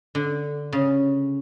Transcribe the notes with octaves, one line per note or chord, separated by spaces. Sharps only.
D3
C#3